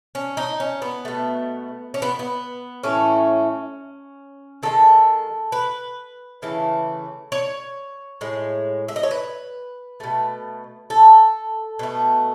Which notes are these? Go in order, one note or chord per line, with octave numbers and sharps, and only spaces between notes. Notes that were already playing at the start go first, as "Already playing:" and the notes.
C#4
D#4
C#4
B3
B2 A3
C#4
B3
B3
A2 E3 A3 C#4
D#3 G#3 A4
B4
C#3 E3 A3
C#5
A2 G#3
E5
D#5
C#5
B4
B2 A3
A4
B2 A3